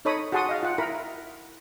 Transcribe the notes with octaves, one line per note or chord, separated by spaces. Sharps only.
D#4 A4 C#5 D#5 B5 D#6
F#4 G#4 F#5 A5 C6 D#6
D#5 F5
F4 F#5 G5
E4 A#4 B5